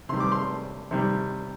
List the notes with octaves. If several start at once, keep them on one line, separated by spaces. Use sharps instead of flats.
C3 D#3 G3 C6
D6
C6
C3 D#3 G3